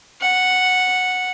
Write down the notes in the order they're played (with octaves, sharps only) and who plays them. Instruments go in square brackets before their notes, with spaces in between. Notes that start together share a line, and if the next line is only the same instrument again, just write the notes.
[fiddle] F#5